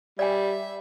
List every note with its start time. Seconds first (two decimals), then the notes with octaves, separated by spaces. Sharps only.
0.19 G3 D5 E5 G#5